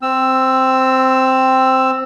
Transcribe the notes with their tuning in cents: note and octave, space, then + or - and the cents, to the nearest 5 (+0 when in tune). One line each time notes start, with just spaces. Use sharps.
C4 +0 E6 +5